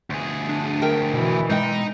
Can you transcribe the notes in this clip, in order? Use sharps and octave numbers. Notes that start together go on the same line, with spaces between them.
D2 G#4
D4
A#4 E5 G5
B2 E3
B2 G#3 D#4 E5 G5